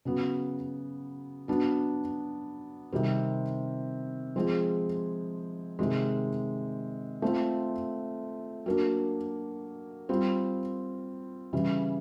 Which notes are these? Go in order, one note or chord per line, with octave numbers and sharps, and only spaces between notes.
C#3 F#3 B3
F#3 B3 D4
C3 D#3 G3 C4
F3 G#3 C4 F4 G#4
C3 D#3 G#3
A3 C4 F4
F#3 A#3 D4
G3 C4 F4
C#3 E3 G3